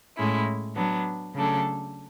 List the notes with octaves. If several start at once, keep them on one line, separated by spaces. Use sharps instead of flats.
A2 G#3 C#4 E4
F#3 B3 D4
C#3 F#3 A3 D4 A4